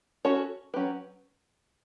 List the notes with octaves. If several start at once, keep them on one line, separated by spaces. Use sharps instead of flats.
C#4 F#4 A4 C#5
F#3 C#4 G4 B4